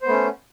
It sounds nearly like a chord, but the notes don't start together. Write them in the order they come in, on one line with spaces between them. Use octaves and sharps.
C5 B3 A3 C#4